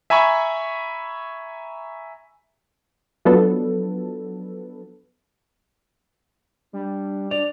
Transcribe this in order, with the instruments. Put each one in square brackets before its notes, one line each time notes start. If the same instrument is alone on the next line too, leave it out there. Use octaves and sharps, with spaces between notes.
[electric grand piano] E5 G#5 A#5 B5 C#6
[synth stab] F3 F#3 B3 D4 A4 B4
[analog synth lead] G3 [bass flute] D4
[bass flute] D4 [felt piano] D5 [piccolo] F7